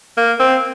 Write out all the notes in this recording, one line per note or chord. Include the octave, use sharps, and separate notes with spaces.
A#3
C4